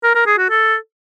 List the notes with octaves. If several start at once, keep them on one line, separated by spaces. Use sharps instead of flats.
A#4
A#4
G#4
F#4
A4